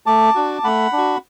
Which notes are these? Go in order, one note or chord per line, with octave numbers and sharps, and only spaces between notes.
A3 A5 D6
D4 F#4
A3 F#5 B5
D4
F#4